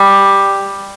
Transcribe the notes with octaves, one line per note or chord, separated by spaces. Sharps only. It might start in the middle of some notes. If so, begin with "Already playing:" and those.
Already playing: G3